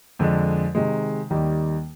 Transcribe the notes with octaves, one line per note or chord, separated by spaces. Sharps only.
F2 D3 G#3
C3 D#3 G#3
D#2 D#3 G3 A#3